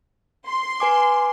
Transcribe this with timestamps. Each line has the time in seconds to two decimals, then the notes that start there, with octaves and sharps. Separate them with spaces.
0.47 C6
0.80 B4 G#5 D6